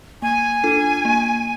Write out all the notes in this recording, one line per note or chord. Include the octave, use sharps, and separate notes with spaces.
A#3 G#5
D4 F4 A4
A#3